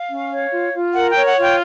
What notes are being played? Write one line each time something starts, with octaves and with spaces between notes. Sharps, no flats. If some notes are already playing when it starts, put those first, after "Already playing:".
Already playing: F5
C#4
C#5
F4
F4
A#4 F#5
G5
C#5
F#5
F4
G5